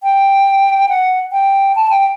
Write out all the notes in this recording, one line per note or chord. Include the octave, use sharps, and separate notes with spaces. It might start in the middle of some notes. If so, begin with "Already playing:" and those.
G5
F#5
G5
A5
G5